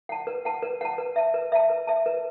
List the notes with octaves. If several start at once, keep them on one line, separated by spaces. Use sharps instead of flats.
F#5 A5
B4
F#5 A5
B4
F#5 A5
B4
E5 A5
B4
E5 A5
B4
E5 A5
B4